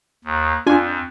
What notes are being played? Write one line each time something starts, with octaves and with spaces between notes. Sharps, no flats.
D#2
F2 D4 F4 G#5